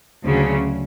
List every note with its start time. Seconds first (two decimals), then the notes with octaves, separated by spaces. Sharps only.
0.25 D2 C#3 F#3